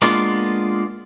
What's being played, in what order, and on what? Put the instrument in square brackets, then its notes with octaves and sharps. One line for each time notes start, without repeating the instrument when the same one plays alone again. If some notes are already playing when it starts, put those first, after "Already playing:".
[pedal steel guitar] G#3 A#3 B3 D4 F4